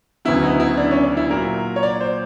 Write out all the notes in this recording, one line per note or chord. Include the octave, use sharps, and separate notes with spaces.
D2 C#3 F#3 B3 E4
D#4
E4
D4
C#4
D4
E4
A#2 F#3 A#3 A#4
C#5
D5
C5